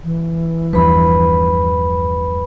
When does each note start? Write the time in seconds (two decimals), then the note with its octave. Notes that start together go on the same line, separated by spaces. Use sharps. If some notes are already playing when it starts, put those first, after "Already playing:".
0.04 E3
0.73 E2 G2 F3 B4 B5